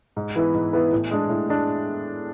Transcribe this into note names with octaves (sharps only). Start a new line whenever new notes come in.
G#2
E3 B3 E4 B4
G#2
E3 B3 E4 B4
A2
G#3 D4
A2
G#3 D4